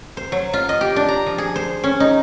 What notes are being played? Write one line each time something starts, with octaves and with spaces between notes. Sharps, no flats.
C5
F#3
F4
D#5
G4
D4
A#5
F3
G#4
C5
C#4
D#4